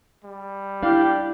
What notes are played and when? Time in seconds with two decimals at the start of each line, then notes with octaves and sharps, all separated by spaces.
0.24 G3
0.83 D4 E4 G4 F5